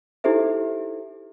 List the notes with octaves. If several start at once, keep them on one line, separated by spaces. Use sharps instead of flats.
D#4 E4 G4 A4 C5 E5